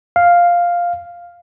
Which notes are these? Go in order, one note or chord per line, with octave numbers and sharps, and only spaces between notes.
F5